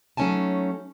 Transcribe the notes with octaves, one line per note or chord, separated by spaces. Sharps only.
F#3 A3 C#4 D#4 G#5 A5